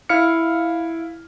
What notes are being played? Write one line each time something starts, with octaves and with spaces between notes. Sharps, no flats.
E4 F5 F6 C#7